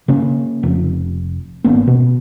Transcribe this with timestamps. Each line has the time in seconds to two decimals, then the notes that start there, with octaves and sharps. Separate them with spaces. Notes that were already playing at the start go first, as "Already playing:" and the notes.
0.08 C#3 A#3 C#4
0.63 F1
1.64 G#1 A#3 B3 C#4
1.87 B2